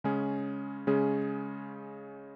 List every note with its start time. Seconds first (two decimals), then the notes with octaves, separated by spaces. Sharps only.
0.04 C#3 G#3 C#4 G#4
0.87 C#3 G#3 C#4 G#4